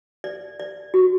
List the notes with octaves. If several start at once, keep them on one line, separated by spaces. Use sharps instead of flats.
D5
D5
F#4